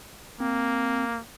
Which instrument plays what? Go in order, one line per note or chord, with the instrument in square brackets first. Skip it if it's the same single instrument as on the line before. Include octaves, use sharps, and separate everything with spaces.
[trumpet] A#3 [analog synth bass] C4